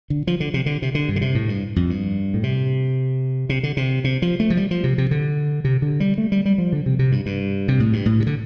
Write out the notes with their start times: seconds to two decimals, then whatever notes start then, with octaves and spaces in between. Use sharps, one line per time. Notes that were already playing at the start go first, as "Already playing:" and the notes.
0.10 D3
0.27 F3
0.40 D3
0.54 C3
0.66 D3
0.82 C3
0.95 D3
1.09 G2
1.16 D3
1.21 C3
1.35 A2
1.49 G2
1.76 F2
1.90 G2
2.34 A2
2.43 C3
3.49 C3
3.63 D3
3.77 C3
4.04 C3
4.22 F3
4.40 A3
4.50 F3
4.57 G3
4.71 F3
4.84 C3
4.98 C3
5.11 D3
5.64 C3
5.82 D3
6.00 G3
6.18 A3
6.32 G3
6.46 G3
6.58 F3
6.73 D3
6.86 C3
6.99 C3
7.12 G2
7.26 G2
7.68 C3
7.80 A2
7.93 G2
8.06 A2
8.20 C3
8.27 D3